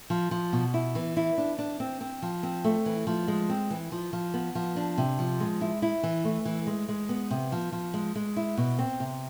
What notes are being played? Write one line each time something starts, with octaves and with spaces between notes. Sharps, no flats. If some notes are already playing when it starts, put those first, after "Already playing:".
F3
F3
B2
E4
E3
E4
D4
D4
C4
C4
F3
C4
A3
E3
F3
G#3
C4
E3
F3
F3
B3
F3
D4
C3
F3
G#3
E4
E4
E3
A3
E3
G#3
G#3
B3
C3
F3
F3
G#3
G#3
E4
B2
C4
C3